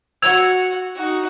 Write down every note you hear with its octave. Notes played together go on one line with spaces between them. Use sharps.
F#4 E6 G#6 F7
D#4 F#4